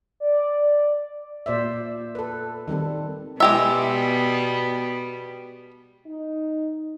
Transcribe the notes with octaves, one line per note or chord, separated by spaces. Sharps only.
D5
A#2 C5 D5 E5
A4 B4
D#3 G3 C4 A4
B2 G3 G#3 B3 G4 E5
D#4